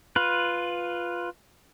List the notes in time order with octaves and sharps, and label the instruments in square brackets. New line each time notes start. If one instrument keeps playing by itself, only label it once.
[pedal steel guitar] F4 B4